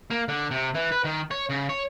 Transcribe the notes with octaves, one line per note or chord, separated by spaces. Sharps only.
A#3
D3
C3
E3
B4
D#3
C#5
C#3
C#5